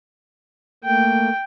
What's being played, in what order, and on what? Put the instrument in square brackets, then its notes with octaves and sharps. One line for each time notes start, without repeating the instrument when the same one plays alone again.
[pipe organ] A3 A#3 [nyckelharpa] G5